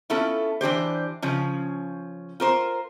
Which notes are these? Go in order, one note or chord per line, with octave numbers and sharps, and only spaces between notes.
B3 C#4 E4 F4 A4
E3 D4 G4 C5
C#3 F3 C#4
F4 A#4 C5